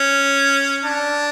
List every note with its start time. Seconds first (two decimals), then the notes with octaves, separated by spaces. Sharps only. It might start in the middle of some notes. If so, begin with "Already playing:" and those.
Already playing: C#4
0.84 D4